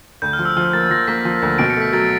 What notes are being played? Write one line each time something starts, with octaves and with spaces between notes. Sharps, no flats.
D2 G6
F6
F3
E6
F3 F6
A#3 A6
F3 A#6
A#3 B6
F3
D2
B2 D7
C#7
A3
B6
F#3 A6